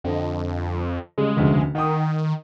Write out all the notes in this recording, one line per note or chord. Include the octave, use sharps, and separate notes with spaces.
F2 D3 F3 D#5
C#3 G3 G#3
F1 D2 C#3
D#3 F#5 G5 D#6